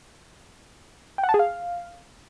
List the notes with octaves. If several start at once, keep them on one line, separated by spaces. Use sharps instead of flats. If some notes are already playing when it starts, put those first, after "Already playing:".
G5
F#5
A5
G#4
F5